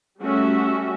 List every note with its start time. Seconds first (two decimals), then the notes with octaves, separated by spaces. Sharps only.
0.19 G3 A3 C#4 F#4 E5